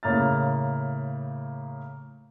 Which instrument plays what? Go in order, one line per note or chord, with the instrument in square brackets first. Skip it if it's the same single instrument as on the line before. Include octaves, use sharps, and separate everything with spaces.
[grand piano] A2 C#3 A#3 F6 A6